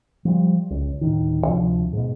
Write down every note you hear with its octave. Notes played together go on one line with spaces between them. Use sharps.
F3 G3
C#2
D1 A#1 D#3
D2 C3 F3
G#2 B2